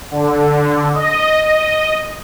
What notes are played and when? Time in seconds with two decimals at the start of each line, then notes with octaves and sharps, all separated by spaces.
0.11 D3
0.94 D#5
1.45 D#5